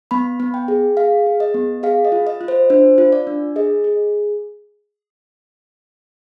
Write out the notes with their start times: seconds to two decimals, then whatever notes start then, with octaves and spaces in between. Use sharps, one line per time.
0.11 B3 B5
0.40 B3
0.54 G5
0.68 G#4
0.97 G#4 F5
1.26 G#4
1.40 D#5
1.54 B3
1.83 G#4 F5
2.05 D#5
2.12 F4
2.27 D#5
2.41 F4
2.48 C5
2.70 D4 C5
2.98 F4
3.12 D5
3.27 D4
3.56 G#4 D#5
3.84 G#4